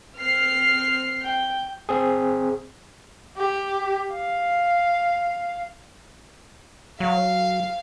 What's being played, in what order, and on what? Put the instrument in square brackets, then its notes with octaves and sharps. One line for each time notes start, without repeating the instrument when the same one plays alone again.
[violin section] C4 F6 C7
[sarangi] G5
[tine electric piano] C4 G#4
[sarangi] G4
F5
[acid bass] F#3 [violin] F5